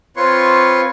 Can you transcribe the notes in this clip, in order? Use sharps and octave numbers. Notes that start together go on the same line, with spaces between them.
C4 F4 B4 C#5 C6 C#6